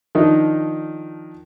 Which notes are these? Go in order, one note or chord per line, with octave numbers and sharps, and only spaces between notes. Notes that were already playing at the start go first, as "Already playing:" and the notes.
D#3 F3 D4 D#4